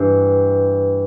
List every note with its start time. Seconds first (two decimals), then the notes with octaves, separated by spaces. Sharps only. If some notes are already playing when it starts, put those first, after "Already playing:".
Already playing: G2 E3